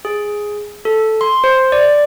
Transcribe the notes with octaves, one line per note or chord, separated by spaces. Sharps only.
G#4
A4
C6
C5
D5